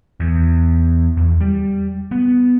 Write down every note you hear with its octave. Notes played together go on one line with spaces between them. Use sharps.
E2
E2
G3
B3